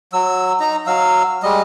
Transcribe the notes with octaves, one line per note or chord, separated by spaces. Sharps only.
F#3 E6
D#4 A#5
F#3 F5 E6
G3 G#3 D#5